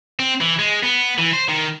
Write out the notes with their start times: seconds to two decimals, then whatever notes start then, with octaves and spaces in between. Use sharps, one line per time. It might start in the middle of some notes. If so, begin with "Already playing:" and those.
0.19 C4
0.41 E3
0.59 G#3
0.83 B3
1.19 E3
1.34 C5
1.49 D#3